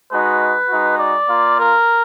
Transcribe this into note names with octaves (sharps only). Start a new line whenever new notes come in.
G#3 D#4 F#4 B4
G#3 D#4 F#4
D5
A#3 F4
A#4